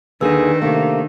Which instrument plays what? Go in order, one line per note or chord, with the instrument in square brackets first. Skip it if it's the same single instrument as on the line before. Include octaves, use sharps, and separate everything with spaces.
[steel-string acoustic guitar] D#2 D3 G#4 [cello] D#3 [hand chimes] D4 E6 [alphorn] B4
[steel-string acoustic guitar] C3 A3 [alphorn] A#3